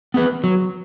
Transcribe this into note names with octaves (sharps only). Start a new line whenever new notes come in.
B3 G#4 B4
F#3